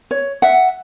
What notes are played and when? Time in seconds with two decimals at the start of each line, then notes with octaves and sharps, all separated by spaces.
0.11 C#5
0.42 E5 F#5